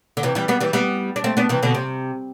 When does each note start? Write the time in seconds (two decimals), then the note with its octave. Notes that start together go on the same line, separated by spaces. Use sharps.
0.17 D3
0.23 C3 E3
0.35 E3 G3
0.48 G3 B3
0.61 E3 G3
0.73 G3 B3
1.16 D4
1.24 A3 C4
1.37 B3 D4
1.49 C3 E3
1.63 B2 D3
1.75 C3